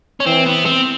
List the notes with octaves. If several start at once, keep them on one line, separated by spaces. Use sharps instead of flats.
C#4
E3 C4
B3
C4